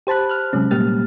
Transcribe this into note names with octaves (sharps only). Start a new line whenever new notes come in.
G4 C5 A5 B5 F#6
F6 F#6
C3 F#3 G#3 C#4
A#2 G3 A#3 G4 F6 A6